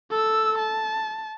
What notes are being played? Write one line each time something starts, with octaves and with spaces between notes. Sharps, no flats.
A4 E6
A5